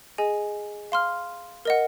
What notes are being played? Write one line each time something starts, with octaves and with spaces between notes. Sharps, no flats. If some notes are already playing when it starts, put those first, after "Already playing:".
G#4 D#5 G#5
F5 C6 F6
A#4 D#5 F#5